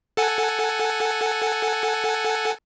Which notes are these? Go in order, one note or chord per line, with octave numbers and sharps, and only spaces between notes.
A4 F#5 G#5